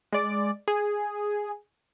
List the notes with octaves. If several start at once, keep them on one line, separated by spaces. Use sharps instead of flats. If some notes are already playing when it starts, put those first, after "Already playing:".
G#3 D5
G#4